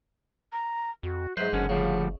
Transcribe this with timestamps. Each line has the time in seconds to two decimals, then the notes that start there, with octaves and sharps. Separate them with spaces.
0.52 A#5
1.03 F2 F#4
1.37 G#2 F#3 B4 C5 E5
1.53 F#1 F#2 D3 C#4 F#5
1.69 D2 C#3 F3 G3